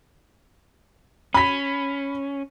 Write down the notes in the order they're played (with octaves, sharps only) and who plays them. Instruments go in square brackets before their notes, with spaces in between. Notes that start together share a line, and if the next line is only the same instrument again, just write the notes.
[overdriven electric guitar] C#4 [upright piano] B5 B6